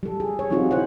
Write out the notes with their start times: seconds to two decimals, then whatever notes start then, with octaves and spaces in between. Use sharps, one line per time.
0.03 G3 A4
0.20 G#4
0.39 C#5
0.50 G3 C4 D#4 F4 F#4 G#4
0.71 E4 C5 C#5 F#5